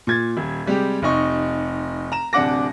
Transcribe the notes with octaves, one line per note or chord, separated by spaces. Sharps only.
A#2 G#6 A6
D#1
C3 G3 G#3 G4
F1 C3 D#4 C#6
A#5 E7
D1 C3 D4 F#5 D6 A#6